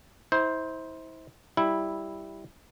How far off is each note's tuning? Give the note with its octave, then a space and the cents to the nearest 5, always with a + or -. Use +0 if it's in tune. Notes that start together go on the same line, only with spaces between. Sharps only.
E4 -40 C5 +0
G3 +0 E4 -5